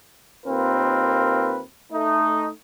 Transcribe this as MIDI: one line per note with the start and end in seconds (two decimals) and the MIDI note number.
0.46 1.61 39
0.46 1.61 60
0.46 1.61 65
0.46 1.61 70
0.46 1.61 71
1.93 2.48 57
1.93 2.48 63